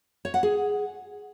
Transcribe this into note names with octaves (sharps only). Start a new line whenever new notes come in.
C#5
F#5
G#4